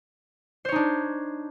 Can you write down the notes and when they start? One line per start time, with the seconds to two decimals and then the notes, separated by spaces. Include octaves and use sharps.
0.65 C5
0.68 C#5
0.72 D#4
0.76 D4